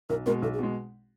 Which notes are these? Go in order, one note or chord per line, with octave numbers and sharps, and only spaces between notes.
B1 A#4
B2 G#3 A#4
B1 A4
G#4
B2 G#3